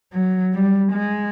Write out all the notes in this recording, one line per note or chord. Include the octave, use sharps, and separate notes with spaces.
F#3
G3
G#3